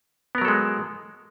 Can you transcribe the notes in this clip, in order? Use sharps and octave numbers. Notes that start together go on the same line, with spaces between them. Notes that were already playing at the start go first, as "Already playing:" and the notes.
F#3 G#3 B3 A4 A#4